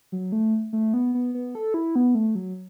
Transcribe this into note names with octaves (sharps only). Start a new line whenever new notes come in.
F#3
A3
A3
B3
B3
B3
A4
E4
B3
A3
F#3